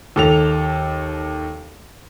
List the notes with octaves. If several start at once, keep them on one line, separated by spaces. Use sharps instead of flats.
D#2 A4 F7